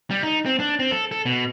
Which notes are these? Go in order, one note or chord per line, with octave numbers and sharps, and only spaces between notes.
G3
D#4
C4
D4
C4
A4
A4
B2